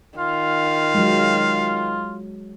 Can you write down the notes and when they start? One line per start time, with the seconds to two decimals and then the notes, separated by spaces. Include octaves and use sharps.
0.19 D#3 F4 F5
0.95 F#3 G#3